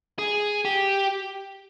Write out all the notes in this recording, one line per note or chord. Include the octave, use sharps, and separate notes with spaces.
G#4
G4